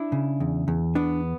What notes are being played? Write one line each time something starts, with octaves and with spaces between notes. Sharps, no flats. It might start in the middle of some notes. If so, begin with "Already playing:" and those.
Already playing: D4 E4
C#3
E2
E2
B3 D4